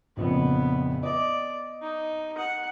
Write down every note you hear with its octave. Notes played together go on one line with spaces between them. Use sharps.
A#1 F2 C#3 B3
D5 D#5
D#4
F#5